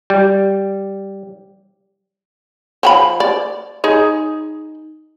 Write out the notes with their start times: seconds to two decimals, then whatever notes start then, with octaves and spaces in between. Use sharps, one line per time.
0.10 G3
2.83 F3 G5 B5
3.20 D5
3.84 D#4 G#4